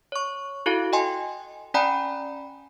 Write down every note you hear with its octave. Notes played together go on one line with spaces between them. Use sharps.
C#5 C#6
E4 F#4 A4 F5
D#5 G5 G#5 C6
C#4 D5 G5 G#5 A#5 B5